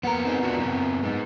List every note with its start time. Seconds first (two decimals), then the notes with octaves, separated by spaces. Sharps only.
0.03 F2 A#3 B3 A#4 F#5
0.25 C4 D#4 G#4
0.43 D4 F4 F#4
0.58 F#2 C4 B4
1.03 G#3 D#4